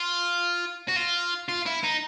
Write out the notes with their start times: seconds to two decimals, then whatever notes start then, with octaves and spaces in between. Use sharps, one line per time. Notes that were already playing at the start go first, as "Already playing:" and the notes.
Already playing: F4
0.88 F#4
0.96 F4
1.49 F4
1.66 E4
1.83 D#4